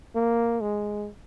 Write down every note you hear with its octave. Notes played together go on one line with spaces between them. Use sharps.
A#3
G#3